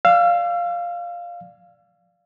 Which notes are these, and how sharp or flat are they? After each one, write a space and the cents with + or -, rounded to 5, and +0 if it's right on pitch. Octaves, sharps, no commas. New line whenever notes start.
D5 +0 F5 +0 E6 +40